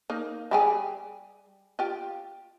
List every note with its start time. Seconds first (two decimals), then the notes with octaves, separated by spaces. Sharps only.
0.10 A#3 D#4
0.51 G3 G4 G#4
1.79 F4 G4